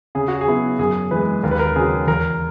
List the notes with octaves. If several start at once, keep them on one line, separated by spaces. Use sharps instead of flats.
C#3 G#4
F#4
G#4
F#3 B3 E4
F#2 G#4
E3 G#3 B4
D#2 A#4
B4
A#4
C#3 F#3 G#4
E2 A#4